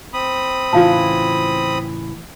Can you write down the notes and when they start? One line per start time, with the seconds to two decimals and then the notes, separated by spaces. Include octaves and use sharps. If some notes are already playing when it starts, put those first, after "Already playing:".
0.14 C4 B5 D#6
0.73 A2 C#3 E3 F4 F5 A5